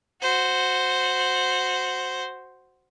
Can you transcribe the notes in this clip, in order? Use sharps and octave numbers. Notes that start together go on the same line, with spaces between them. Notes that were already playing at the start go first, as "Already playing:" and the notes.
F#4 C5